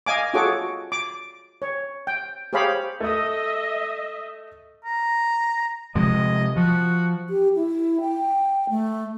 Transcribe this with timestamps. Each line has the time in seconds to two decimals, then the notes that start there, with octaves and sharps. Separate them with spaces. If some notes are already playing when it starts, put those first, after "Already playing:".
0.06 D#5 F5 G#5 D6
0.34 F4 F#4 G#4 A4 C#5 D6
0.92 D6
1.62 C#5
2.07 G5
2.53 G4 G#4 C5 C#5 F5 B5
3.00 A3 D#5 E5 D#6
4.85 A#5
5.95 C3 F3 G#3 D#5
6.57 F3 F#4
7.30 G4
7.56 E4
8.01 G5
8.70 A3